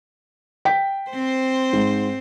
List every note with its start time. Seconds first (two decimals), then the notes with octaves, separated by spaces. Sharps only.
0.65 G5 B6
1.11 C4 C5
1.73 G#2